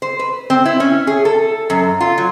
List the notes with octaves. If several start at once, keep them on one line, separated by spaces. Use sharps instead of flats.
C5
B4
C4
E4
C#4
G#4
A4
F#2
F4
F#3